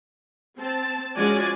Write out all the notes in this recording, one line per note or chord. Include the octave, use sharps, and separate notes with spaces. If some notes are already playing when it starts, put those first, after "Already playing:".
C4 A5
F3 G#3 C#4 F#4 D5 G#5